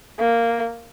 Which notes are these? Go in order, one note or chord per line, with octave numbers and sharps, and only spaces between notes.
A#3